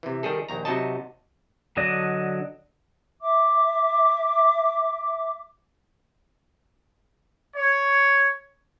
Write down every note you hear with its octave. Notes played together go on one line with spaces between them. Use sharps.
C3 E3
D#3 G3 G#4 A4
A#1 D#2 A#5
C3 F#3 D#4 F#4 D#5 A5
D3 F#3 D4 D#5
E5 D6
C#5